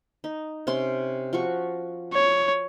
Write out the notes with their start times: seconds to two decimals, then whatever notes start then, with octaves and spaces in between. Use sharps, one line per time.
0.24 D#4
0.67 C3 C#4 C6
1.33 F3 F#4 C#6
2.13 C#5